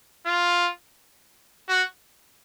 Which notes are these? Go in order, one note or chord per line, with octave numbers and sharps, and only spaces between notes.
F4
F#4